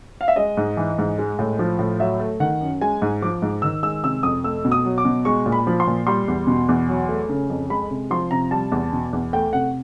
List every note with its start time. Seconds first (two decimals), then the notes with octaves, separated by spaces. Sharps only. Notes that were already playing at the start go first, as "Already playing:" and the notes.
0.21 F5
0.28 E5
0.36 G#3 D#5
0.57 G#2
0.77 E3
0.98 G#2
1.19 G#3
1.39 A2
1.59 F3
1.79 A2
2.00 F#3 E5
2.20 A3
2.40 D#3 F#5
2.61 F#2
2.81 G#3 G#5
3.02 G#2
3.22 F3 D6
3.42 G#2
3.62 D#3 E6
3.83 G#3 E6
4.04 C3 E6
4.23 F2 D#6
4.44 A3 E6
4.65 B2
4.72 D#6
4.85 F#3
4.98 D6
5.05 B2
5.25 G#3 C#6
5.46 A#2
5.52 B5
5.67 F3
5.80 C6
5.87 A#2
6.07 G3 C6
6.28 E2
6.47 B2
6.69 E2
6.89 F#3
7.09 A3
7.29 C#3
7.50 F2
7.70 G#3 B5
7.90 C3
8.11 F3 C6
8.31 C3 A#5
8.51 G3 A5
8.72 E2
8.93 B2
9.13 E2
9.33 A3 G5
9.53 C3 F#5